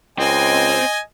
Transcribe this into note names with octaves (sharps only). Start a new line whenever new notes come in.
C#2 C4 D#5 G#5